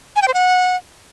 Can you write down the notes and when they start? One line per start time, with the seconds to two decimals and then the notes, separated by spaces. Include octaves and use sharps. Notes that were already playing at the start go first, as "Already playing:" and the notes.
0.16 G#5
0.22 G5
0.28 C5
0.34 F#5